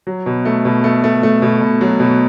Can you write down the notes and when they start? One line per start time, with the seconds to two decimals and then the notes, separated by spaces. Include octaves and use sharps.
0.07 F#3
0.26 B2
0.45 A3
0.65 B2
0.84 A3
1.04 A3
1.23 A3
1.42 B2
1.61 B2
1.81 F#3
2.00 B2